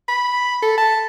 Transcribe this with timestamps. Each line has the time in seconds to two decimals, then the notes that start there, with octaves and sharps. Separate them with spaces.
0.09 B5
0.62 A4
0.78 A5